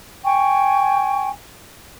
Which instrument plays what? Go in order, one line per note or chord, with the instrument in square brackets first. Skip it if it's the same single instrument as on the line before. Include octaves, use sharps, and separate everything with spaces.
[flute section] G5 G#5 C#6